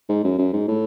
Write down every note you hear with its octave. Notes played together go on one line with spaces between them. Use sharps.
G#2
F#2
F#2
G#2
A2